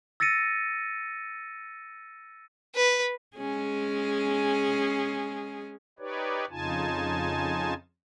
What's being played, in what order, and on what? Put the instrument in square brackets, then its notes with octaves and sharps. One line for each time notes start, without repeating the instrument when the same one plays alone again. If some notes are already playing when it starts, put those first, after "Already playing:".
[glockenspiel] E6 A6 A#6 C#7 D#7
[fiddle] B4
[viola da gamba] G#3 C#4 G#4
[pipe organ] D#4 G4 B4 C#5 D5
F2 C#3 D#4 F4 G#5 A5